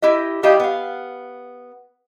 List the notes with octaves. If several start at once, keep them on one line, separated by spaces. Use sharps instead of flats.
E4 G4 D#5
G3 E4 G4 D#5 F5 G5
B3 F5